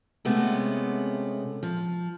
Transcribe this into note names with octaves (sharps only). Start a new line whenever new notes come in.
C3 G#3 A3 B3 C#4 F#4
F3